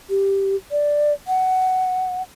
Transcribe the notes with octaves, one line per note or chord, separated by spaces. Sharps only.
G4
D5
F#5